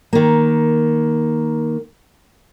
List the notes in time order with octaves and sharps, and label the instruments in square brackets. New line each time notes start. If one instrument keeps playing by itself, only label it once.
[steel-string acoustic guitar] D#3 A#3